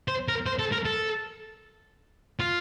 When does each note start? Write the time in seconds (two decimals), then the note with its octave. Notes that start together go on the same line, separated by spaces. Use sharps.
0.08 C5
0.28 A#4
0.46 C5
0.59 A4
0.72 A#4
0.85 A4
2.40 F4